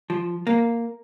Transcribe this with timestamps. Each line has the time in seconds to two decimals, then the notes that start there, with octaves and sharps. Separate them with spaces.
0.10 F3
0.47 A#3